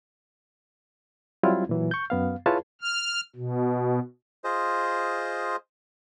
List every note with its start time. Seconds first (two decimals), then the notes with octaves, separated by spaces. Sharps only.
1.43 F#3 G3 C4 E4 F4
1.69 A#2 E3 F#3
1.91 C#6 G6
2.10 F#2 B3 F5
2.46 E4 F4 G#4 B4 C#5 A5
2.81 F6
3.36 B2
4.44 F4 G#4 C5 D#5